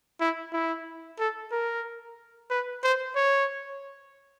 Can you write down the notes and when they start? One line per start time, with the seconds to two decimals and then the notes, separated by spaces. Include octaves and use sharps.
0.20 E4
0.53 E4
1.19 A4
1.52 A#4
2.50 B4
2.83 C5
3.16 C#5